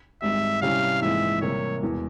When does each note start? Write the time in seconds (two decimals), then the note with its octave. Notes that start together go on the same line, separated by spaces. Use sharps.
0.22 G#1 G#2 G3 E5
0.62 C3 G3 C#4 E4 F5
1.02 A#1 G#2 E3 G#3 C4 E5
1.42 C3 E3 G3 A#3 E4 C#5
1.82 E1 E2 E3